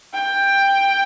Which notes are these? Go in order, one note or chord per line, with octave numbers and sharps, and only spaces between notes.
G5